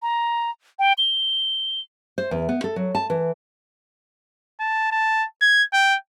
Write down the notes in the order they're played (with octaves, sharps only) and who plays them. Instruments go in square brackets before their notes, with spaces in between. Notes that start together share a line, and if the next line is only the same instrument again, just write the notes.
[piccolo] A#5
G5
G7
[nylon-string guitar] C5
E2
B3
A4
F#3
A5
E3
[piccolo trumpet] A5
A5
G#6
G5